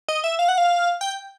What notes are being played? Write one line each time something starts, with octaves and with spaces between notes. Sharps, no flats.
D#5
E5
F5
F#5
F5
G5